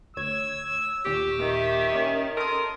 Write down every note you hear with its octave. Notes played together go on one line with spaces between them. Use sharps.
D2 C#5 E6 G#6
D#2 A#2 G4 C#6
D#3 E5
C#4
A4 A#4 C6 D#6